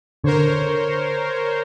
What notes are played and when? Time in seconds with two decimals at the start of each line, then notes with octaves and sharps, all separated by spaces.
0.24 D3 A#4 C5 C#5